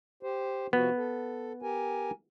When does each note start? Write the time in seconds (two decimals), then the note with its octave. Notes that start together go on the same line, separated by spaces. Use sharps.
0.23 G4 C5
0.73 C3 F3 B3 F#4
0.97 A4
1.62 G4 A#4 G#5